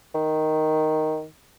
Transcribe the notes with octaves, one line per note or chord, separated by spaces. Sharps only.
D#3